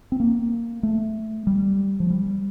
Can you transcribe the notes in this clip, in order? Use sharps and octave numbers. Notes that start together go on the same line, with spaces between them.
C4
A#3
A3
G3
F3
G3